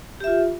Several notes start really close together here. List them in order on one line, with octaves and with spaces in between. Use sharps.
G4 E5 F4